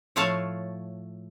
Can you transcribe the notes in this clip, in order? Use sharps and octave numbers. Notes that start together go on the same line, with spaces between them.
A2 F3 A3 C#5 F5 A5